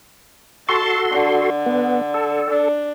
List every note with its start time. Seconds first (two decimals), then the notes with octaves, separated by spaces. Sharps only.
0.69 F#4 A4 A5 C6
1.12 D3
1.66 B3
2.14 A4
2.50 D4